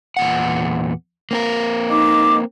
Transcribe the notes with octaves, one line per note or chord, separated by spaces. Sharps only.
E2 A#2 F#5
A#3 C4 A#4
D#4 D#5 D6